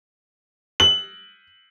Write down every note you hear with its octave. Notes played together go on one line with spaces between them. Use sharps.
F#7